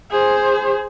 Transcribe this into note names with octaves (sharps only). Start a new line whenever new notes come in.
G#4 C5